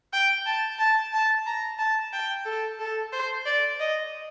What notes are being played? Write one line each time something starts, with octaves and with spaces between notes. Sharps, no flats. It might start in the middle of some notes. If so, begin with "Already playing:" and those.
G5
A5
A5
A5
A#5
A5
G5
A4
A4
C5
D5
D#5